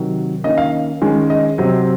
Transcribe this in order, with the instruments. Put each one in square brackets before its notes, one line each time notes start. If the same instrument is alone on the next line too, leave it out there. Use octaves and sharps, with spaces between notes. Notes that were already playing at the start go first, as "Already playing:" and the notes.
Already playing: [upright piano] C3 D#3 F#3
D#3 A#3 C#4 D#5
F5
D#3 G#3 C#4
D#5
C3 F#3 C4